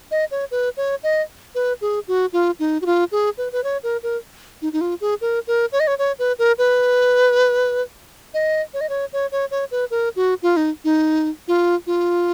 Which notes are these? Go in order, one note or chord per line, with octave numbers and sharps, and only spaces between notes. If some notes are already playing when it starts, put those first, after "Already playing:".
D#5
C#5
B4
C#5
D#5
B4
G#4
F#4
F4
D#4
F#4
F4
G#4
B4
B4
C#5
A#4
A#4
D#4
D#4
F4
G#4
A#4
A#4
C#5
D#5
C#5
C#5
B4
A#4
B4
D#5
C#5
D#5
C#5
C#5
C#5
C#5
B4
A#4
F#4
F4
D#4
D#4
F4
F4